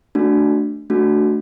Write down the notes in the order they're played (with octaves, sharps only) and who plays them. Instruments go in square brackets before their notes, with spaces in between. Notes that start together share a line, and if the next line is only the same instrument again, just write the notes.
[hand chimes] A3 D4 F#4
A3 D4 F#4